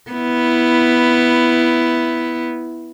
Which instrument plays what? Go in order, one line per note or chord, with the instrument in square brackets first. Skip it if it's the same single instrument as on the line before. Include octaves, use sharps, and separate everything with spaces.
[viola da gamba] B3 E4